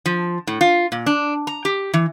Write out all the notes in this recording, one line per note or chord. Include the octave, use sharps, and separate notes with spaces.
F3
A2
F4
A#2
D4
A#5
G4
E3